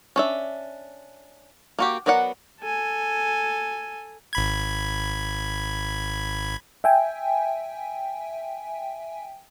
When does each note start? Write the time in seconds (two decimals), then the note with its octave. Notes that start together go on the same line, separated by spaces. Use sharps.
0.16 C#4 D4 E5
1.79 A#3 F#4 G4
2.06 F#3 B3 A#4 D5 F#5
2.60 A4 G#5
4.33 G#1 B5 G#6
6.84 E5 G5 G#5